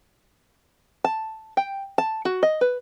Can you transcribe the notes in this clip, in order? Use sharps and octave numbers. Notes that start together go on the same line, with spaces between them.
A5
G5
A5
F#4
D#5
B4